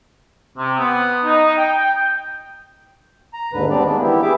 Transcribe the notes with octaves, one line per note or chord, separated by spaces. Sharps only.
C3
B3
D#4
G5
A#5
D#2 G#2 D3 B4
G3 B3 C4 D4 D5
D#3 G#3 A#3 B3 D4
E3 B3 E4 G4
G4 G#4 E5 D6